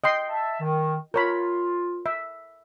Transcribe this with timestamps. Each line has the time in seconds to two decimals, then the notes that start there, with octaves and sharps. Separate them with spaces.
0.04 D#5 G5 C6
0.29 E5 A5
0.61 D#3
1.14 F4 A#4 C#5 B5
2.06 E5